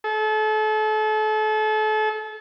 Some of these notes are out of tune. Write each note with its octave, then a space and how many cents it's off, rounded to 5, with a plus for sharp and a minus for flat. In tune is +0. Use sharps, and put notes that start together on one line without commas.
A4 -35